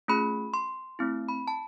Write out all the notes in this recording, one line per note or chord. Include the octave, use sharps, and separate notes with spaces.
A3 C#4 F4 G#4 B5
C6
A3 C4 E4
B5
A5